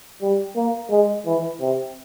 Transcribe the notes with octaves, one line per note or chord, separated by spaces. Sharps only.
G3
A#3
G#3
E3
C3